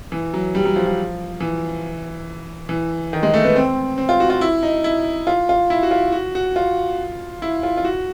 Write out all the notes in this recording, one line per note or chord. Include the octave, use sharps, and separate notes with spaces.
E3
F#3
G3
F#3
F3
F3
E3
E3
D#3
G#3
A3
B3
C4
C4
F4
F#4
F4
E4
D#4
E4
F4
F4
E4
F#4
F4
F#4
F#4
F4
E4
F4
F4
F#4